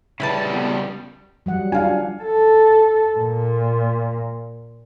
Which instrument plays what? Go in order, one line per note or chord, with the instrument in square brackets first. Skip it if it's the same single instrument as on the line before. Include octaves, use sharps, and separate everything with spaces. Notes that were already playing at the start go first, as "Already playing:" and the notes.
[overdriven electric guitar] C#3 G3 [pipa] E4 B4 A5
[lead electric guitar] F2 B2
[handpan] F#3 G3 F#5
[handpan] D4 F4 [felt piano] F5 G#5
[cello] A4
A#2